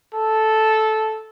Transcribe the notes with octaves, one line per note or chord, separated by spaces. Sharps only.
A4